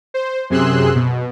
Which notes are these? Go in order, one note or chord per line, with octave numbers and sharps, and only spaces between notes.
C5
F#2 C3 G#4 C6 E6 F#6
B2